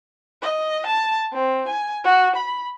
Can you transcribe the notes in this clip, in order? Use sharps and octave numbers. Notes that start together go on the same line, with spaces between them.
D#5
A5
C4
G#5
F#4
B5